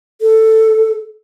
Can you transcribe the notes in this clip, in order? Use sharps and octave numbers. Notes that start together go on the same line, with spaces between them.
A4